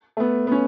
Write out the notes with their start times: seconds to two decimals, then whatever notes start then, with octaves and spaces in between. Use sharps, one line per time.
0.17 A3
0.20 B3
0.47 B3
0.52 C#4